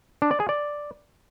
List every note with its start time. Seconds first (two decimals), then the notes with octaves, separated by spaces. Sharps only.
0.22 D4
0.31 D5
0.40 G#4
0.49 D5